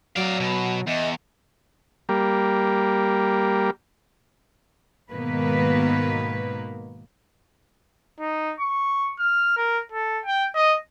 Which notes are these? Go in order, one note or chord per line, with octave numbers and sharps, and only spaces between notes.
F#3 D5 F5
B2
E2 D#5
G3 A#3
G#2 B2 D#3 A#3 B3 B4
D#4
C#6
F6
A#4
A4
G5
D#5